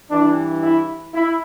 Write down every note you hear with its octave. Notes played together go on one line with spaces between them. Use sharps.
G2 E3 D4
E4
E4